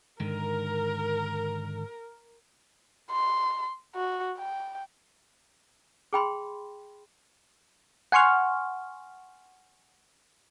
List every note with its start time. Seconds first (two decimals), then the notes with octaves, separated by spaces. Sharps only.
0.20 G#2 D3 D#3 A#4
3.11 C6
3.95 F#4
4.38 G5
6.13 G#4 G5 B5 C6
8.12 F#5 G#5 C6 C#6 F6